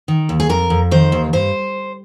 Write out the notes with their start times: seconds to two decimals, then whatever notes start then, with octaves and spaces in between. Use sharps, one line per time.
0.08 D#3
0.29 D#2
0.40 G#4
0.49 F2 A#4
0.70 F2
0.91 D#3 C5
1.12 D#2
1.33 G2 C5